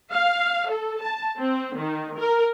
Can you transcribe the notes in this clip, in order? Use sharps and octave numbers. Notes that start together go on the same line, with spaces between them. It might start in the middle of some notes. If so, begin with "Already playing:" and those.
F5
A4
A5
C4
D#3
A#4